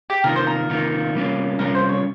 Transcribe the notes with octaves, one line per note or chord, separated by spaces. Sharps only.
G4
C3 D#3 A#3 F4 A#4
C5
A#4
C3 D#3 A#3 F4
C3 G3 A#3 C#4 F4
C3 G3 A#3 C#4 F4 A#4
C5
C#5